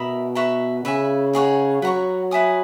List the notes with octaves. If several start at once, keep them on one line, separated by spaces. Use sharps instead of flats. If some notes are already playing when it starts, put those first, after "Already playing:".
Already playing: B2 A#4 E5 B5 D#6
B4 E5 A#5 C#6
C#3 B4 E5 G#5
D#4 G#4 C#5 F#5
F#3 B4 F#5 A#5 C#6
B4 E5 G#5 D#6